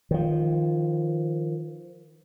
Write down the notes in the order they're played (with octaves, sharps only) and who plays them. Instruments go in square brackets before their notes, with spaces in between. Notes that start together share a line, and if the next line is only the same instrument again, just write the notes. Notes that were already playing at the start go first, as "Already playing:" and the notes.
[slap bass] D#3 F3